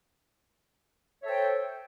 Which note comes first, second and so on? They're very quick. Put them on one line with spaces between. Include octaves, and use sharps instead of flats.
E5 C#5 A4 C5 G5